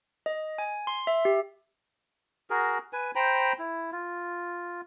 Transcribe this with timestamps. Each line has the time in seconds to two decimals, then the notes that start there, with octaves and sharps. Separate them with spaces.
0.26 D#5
0.58 G#5
0.87 C6
1.07 E5
1.25 G4
2.50 F#4 G#4 A#4
2.93 B4 G#5
3.15 C5 G5 A#5 B5
3.59 E4
3.92 F4